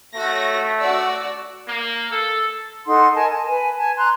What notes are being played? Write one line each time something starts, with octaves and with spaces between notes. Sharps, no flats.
A3 F#4 C#5 A#6
F#4 D5 E6
A#3
A4
D#4 A4 F#5 C6
A#4 D#5 G#5 A5
A5
B4 G#5
G#5 A5
A#5 C6 F#6